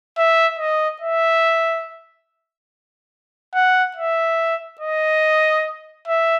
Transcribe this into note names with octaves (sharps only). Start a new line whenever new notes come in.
E5
D#5
E5
F#5
E5
D#5
E5